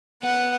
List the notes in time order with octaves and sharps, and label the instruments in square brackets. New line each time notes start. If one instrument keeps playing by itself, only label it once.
[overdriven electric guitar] B3 [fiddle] F#5